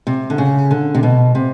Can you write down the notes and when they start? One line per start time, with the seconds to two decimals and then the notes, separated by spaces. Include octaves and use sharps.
0.07 C3
0.30 D3
0.38 C#3
0.71 D3
0.94 C3
1.03 B2
1.35 C3